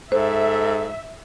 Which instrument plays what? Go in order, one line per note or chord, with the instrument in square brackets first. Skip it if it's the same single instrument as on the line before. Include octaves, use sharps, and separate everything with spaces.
[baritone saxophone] G#2 [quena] A4 [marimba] C5 [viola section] E5